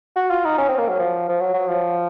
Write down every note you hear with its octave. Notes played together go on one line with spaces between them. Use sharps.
F#4
F4
D#4
C#4
C4
A#3
F#3
F3
F3
F#3
F#3
F3